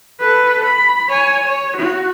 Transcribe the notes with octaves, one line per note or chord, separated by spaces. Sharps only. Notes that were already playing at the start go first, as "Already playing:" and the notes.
A4 B4
B5
C#5 G#5
C#5
F#4